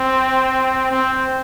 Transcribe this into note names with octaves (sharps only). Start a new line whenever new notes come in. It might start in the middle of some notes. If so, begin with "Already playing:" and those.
Already playing: C4
C4